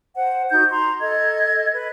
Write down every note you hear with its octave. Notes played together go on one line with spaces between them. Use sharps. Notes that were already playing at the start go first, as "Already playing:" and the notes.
C5 F#5
D#4 F#4 G6
A#5 C6
A4 D#5 G#6
B4